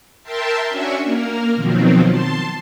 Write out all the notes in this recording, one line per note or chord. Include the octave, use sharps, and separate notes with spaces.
A#4 E5 G5 A5 C6
C#4 D4 F#4 E5 G#5 C#6
A#3 A#4
B2 D#3 F3 F#3 C4
A5 C6